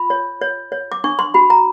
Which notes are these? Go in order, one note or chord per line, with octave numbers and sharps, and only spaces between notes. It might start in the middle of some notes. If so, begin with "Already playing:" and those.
Already playing: F4 B5
C#5
C#5
C#5
D6
D4 C#6
C6
F#4 B5
A#5